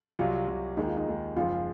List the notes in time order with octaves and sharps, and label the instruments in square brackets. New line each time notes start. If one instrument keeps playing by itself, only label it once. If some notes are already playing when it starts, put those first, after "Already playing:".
[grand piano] C2 C3 F#3 [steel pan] F4
[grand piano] C2 C3 F#3
[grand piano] D#2 D#3 G#3 [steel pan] D#4
[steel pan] F4
D#4
[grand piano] D#2 D#3 G#3
[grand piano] F#1 F#2 F3 G#3 [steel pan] F4